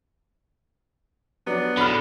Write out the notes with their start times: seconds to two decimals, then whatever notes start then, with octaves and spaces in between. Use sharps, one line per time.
1.47 F#3 B3 D4
1.77 A2 D3 B5 F6